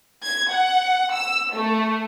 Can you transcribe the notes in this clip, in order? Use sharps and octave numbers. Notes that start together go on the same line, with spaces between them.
G#6
F#5
E6
A3